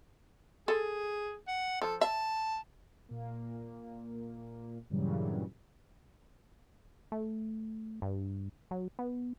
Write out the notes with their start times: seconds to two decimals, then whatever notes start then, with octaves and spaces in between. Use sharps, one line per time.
0.68 G#4 A4
1.48 F#5
1.82 F3 A4
2.01 E5 A5
3.09 A#2 A#3
4.90 G2 A#2 C#3 E3 F#3 G3
7.12 A3
8.02 G2
8.71 F#3
8.99 B3